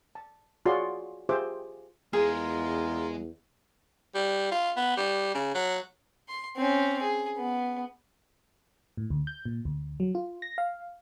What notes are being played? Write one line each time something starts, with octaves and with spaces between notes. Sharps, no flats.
A5
F4 F#4 G#4 C#5 D5 C6
F4 G4 G#4 C5 E5 D6
E2 G#3 F4 G#4 A#4
G3
F4
B3
G3
C#3
F#3
C6
C4 C#4
G#4
B3
A2
D2
G6
A#2
D2
F#3
F4
A#6
F5